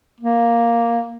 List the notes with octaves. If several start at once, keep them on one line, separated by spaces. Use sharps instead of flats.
A#3